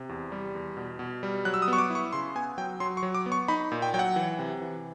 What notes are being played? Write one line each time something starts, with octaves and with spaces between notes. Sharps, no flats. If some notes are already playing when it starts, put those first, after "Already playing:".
Already playing: C3
E2
G3
E2
B2
B2
G3
F#3 F#6
E6
D#6
B3
C#6
D6
E4
C#6
C#3 C6
B3 G#5
F#3 G5
F#3 C6
C#6
F#3
D6
B3
C#6
D#4 B5
A#2
G5
F#3 G5
F#5
E3
C3
E3